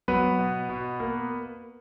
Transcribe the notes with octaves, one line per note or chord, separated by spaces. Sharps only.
F#3 B3 B4
B2
B2
A#3